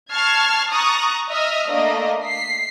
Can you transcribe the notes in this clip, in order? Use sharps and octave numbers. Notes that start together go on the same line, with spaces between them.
A5 C#6 F6 G#6 C7
A#5 C#6 D#6 F#6 A6
D#5 E5 D#6 F6
A3 A#3 D4 D#5
B6 C7